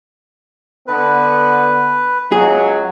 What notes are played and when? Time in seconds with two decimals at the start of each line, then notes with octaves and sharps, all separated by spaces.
0.87 D3 B3 B4
2.32 C#2 F#3 G#4